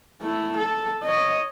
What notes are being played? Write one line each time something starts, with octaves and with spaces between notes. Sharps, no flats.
A3 E4
A4
C#5 D#5